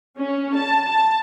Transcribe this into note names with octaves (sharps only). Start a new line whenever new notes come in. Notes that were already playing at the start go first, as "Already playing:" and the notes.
C#4
A5
A5